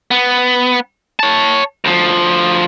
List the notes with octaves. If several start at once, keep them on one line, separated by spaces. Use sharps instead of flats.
B3
C#5 A5
D2 F3